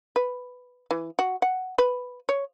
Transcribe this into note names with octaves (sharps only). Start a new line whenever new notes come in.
B4
E3
F#4
F#5
B4
C#5